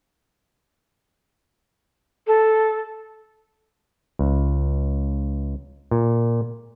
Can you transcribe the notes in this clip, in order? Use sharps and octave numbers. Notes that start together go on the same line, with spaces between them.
A4
C#2
A#2